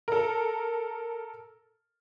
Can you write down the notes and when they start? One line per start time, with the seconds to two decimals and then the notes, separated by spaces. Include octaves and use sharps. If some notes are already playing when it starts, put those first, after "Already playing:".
0.08 A4 A#4